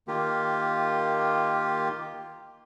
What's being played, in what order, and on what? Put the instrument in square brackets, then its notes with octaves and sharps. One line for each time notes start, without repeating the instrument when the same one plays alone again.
[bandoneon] D#3 A#3 F4 G4